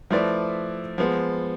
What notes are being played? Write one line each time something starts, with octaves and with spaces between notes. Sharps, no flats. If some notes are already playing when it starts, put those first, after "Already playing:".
F3 A3 E4 B4 D5
F3 G#3 B3